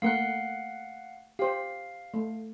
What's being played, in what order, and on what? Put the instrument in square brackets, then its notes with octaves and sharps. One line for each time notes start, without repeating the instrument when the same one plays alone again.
[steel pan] A3 A#3 A#4 [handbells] F5 F#5 F#6
[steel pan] G4 C5 [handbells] F5
[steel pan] A3